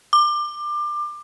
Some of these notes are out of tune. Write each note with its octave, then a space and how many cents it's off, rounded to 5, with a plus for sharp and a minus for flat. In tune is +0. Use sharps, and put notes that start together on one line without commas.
D6 +25